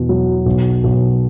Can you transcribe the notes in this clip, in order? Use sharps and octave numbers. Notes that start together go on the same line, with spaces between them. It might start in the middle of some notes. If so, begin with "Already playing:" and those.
Already playing: E2 B2
F#3
B1
B1